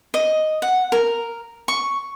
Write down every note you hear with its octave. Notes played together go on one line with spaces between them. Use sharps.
D#5
F#5
A#4
C#6